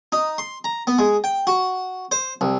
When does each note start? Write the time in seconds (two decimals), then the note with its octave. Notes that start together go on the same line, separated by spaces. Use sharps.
0.12 D#4
0.38 C6
0.64 A#5
0.87 B3
0.99 G#3
1.24 G5
1.47 F#4
2.11 C5
2.41 C2